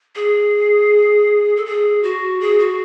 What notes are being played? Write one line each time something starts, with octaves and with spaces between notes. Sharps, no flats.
G#4
A4
G#4
F#4
G#4
F#4